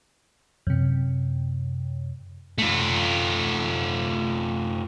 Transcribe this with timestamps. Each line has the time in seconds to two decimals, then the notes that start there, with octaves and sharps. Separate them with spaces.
0.67 F#2 C3
2.58 A3 F4